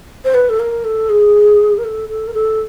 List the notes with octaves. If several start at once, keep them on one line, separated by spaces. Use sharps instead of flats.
C5
B4
A4
A#4
A4
G#4
A#4
A4
A4
A#4
A4